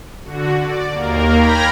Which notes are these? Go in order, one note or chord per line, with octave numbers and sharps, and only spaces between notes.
D3 F#4
D5
D#2 A#3 A#4
G5 A#5 B5 F6 G#6 A#6